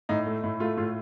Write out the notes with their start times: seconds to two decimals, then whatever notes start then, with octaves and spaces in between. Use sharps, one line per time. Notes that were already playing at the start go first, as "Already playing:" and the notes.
0.09 A2 D#4
0.26 A3
0.44 A2
0.60 A3 F4
0.77 A2 F4